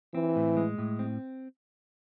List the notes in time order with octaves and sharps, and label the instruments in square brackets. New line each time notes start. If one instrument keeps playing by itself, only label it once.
[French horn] E3 [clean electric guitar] C4
[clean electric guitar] A2
G#3
A2
C4